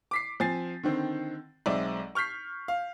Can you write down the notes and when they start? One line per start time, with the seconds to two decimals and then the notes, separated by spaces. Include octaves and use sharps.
0.11 D6 B6 C7
0.40 F3 C4 G#5 A6 C7
0.83 D3 D#3 C4
1.66 B1 G#3 C4 D5 E5
2.15 C#6 F6 G6 B6 C7
2.68 F5